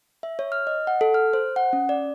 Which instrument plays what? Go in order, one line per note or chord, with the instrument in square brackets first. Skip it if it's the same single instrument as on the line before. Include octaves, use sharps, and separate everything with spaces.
[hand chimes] E5
C#5
F6
D#5
F#5
A4
F6
C5
F#5
C#4
D5